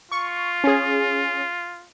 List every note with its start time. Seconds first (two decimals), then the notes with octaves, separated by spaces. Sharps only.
0.12 F4 C#6
0.64 C#4 G#4